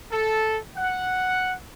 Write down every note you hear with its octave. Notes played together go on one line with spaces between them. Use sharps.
A4
F#5